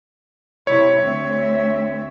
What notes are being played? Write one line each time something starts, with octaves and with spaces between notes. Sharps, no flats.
C3 E4 C#5
D2 C4 E5